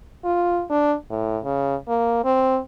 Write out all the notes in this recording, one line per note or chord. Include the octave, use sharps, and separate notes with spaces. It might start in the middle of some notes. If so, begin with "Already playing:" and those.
F4
D4
A2
C#3
A#3
C4